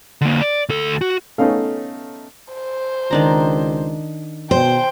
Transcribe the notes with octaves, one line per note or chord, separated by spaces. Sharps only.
D3 A#3
D5
D2 A4
F#4
A3 B3 C#4 D#4 A4 F5
C5
C#2 D#3 D4 A#5
B2 C5 G5